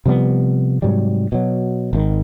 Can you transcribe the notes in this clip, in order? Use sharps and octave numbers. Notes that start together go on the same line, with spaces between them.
C3 F3 G3 B3
G#2 C3 F#3 G3
B2 F#3
G#1 B2 D#3